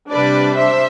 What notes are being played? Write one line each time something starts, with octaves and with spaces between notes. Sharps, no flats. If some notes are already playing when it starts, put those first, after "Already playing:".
C3 G3 D4 B4 D5
C5 E5